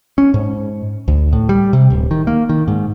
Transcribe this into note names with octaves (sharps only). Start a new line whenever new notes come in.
C#4
G#2
D2
A2
G3
C3
D1
D#3
A#3
D#3
G#2